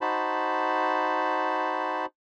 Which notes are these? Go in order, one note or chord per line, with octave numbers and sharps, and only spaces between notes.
D#4 F#4 C5 A5 B5